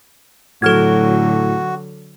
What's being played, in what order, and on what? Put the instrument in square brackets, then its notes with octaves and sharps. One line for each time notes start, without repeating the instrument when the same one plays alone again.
[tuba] A2 [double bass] D3 F#3 [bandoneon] F#4 [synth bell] A4 F6 G#6